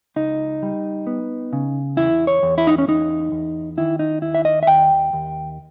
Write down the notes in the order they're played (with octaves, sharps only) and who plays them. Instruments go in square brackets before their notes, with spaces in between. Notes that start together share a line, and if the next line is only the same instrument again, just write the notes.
[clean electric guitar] C#2 D#4
G3
B3
C#3
E2 E4
C#5
E2
E4
D#4
C#4
E2 D#4
E2
D#3 E4
D#4
D#2 E4
E5
D#5
E5
D#2 G5
D#2